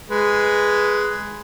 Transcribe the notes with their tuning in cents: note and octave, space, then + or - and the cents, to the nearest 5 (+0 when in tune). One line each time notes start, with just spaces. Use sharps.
G#3 +0 B4 +0